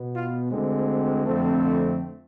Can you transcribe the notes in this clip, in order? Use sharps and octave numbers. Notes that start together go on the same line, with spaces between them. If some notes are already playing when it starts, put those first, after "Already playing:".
Already playing: B2 B3
F4
D2 D3 G#3 C4
F2 D3 A3 C4